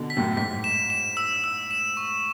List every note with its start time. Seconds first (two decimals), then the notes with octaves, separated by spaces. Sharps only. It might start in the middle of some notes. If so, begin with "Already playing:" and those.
Already playing: B2 D3
0.10 B6
0.17 F#2 A2
0.36 G#2 B6
0.64 E7
0.90 E7
1.17 E6
1.44 E6
1.71 E7
1.97 C#6